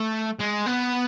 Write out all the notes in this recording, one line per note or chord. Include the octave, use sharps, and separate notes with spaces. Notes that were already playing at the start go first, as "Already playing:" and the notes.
Already playing: A3
G#3
B3